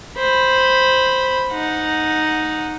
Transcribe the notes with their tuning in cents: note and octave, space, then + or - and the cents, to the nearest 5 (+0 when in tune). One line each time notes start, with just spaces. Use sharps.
C5 +0 B5 +0
D#4 +0 F#5 -15